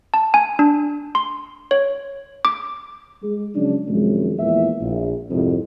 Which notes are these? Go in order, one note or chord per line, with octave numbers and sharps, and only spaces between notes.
A5
G#5
D4
C6
C#5
D6
G#3
C#3 F3 F#3 G#3 C#4 D4
F#2 C3 D#3 F3 G#3
E2 A#2 F3 E4 E5
A#1
C2 F2 G#2 E4